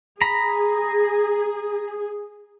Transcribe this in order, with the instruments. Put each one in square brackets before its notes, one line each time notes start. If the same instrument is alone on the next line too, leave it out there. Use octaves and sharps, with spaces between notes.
[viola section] G#4 [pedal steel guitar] A#5 B5